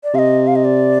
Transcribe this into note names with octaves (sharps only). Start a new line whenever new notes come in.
D5
C3 D#5 F5
F5
D#5
D5